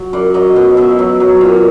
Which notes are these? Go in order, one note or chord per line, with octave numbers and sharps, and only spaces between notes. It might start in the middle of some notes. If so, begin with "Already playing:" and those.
Already playing: F#3
F#2 D5
F#3 D#5
B2 D#5
B2 E5
F#3
F#3
A#2